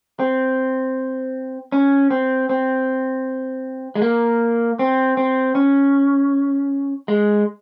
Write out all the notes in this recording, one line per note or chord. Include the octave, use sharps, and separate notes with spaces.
C4
C#4
C4
C4
G#3
A#3
C4
C4
C#4
G#3